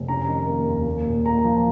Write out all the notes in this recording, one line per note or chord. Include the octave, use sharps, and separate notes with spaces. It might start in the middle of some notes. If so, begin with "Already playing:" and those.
Already playing: F1
C#4 A#5
D#3
A#3
D#2
A#3
A#2
A#3 A#5
F3